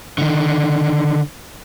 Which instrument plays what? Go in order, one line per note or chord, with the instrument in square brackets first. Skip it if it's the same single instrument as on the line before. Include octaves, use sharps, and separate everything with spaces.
[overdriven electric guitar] D3 D#3